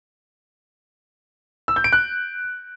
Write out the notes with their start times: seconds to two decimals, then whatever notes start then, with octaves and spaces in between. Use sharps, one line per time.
1.68 E6
1.76 G6
1.84 D7
1.93 F#6